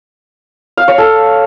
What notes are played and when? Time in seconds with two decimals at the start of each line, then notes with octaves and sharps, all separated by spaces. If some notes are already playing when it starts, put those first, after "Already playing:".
0.77 F5
0.88 C#5
0.98 A4